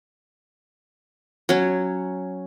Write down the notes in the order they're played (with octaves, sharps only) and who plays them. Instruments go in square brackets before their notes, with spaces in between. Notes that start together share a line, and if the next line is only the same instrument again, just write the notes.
[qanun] F#3 C#4